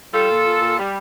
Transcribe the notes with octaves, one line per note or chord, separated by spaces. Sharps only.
G3 F4 A4
A#2
A#2
A#2
G3